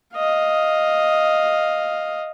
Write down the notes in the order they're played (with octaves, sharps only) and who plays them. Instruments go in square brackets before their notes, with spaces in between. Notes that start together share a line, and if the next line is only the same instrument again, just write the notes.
[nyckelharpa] D#5 F5